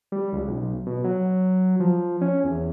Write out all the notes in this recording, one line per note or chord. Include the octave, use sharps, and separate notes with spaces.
G3
C#2
B1
B2
F#3
F3
C#4
E2